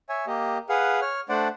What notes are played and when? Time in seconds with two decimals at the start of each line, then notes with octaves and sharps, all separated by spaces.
0.09 C#5 E5 G#5
0.27 A#3 G4 D#5
0.69 G#4 B4 F5 F#5
1.01 C#5 F6
1.29 A3 D4 C5 D5 F#5